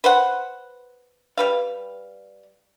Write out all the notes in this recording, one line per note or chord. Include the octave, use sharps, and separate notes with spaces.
B4 C5 F#5
G3 B4 F5